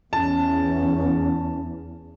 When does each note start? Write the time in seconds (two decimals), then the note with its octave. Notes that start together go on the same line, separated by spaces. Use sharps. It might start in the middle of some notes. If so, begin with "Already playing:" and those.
0.13 E2 C#4 A5